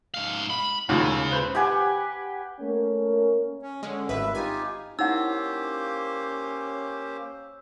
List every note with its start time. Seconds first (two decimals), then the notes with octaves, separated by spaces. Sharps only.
0.14 G#2 F5
0.50 B5
0.89 D#2 A#2 C#3 G#3
1.31 B4 C5
1.55 G4 B4 F#5 G#5
2.61 A3 A#3 C#4 A#4
3.62 C#4
3.83 D3 G#3 C#4
4.09 G#1 G2 B4 E5
4.35 D#4 F4 G4 G#5
4.99 A#3 C#4 D#4 E4 G4 C5 F#5 E6